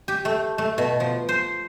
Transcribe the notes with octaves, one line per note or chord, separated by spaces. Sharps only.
G4
A3
A3
B2
F3
C5